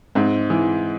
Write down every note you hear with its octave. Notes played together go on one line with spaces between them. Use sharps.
G#2 C4
E3